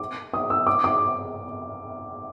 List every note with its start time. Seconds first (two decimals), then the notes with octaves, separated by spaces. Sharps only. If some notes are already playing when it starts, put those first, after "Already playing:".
Already playing: D6
0.34 D#6
0.50 E6
0.67 D6
0.84 D6